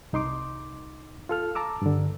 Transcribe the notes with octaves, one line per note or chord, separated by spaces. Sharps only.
C2 D#4 C6 D6
F4 A4 F6
A5 A#5 D6 E6
G2 D3